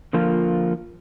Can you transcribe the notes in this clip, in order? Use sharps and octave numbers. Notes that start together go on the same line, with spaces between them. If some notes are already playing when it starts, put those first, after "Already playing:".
D3 F3 A#3 F4